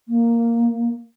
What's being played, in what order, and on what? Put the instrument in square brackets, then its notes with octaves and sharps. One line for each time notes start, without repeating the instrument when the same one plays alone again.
[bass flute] A#3